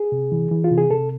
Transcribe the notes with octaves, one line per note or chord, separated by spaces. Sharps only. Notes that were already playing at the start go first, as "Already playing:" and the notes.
Already playing: G#4
C3
E3
E3
F4
C3
G#4
C3 A4